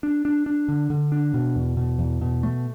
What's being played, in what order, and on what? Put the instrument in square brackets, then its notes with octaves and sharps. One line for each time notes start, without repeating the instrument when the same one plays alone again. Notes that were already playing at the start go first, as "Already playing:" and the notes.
[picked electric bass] D4
D4
D4
D3
D3
D4
B2
E2
B2
E2
B2
A3